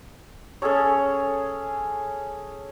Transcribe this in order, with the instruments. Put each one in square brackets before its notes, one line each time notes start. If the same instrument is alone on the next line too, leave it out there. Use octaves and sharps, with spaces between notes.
[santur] C#4 G#4 A4 C#5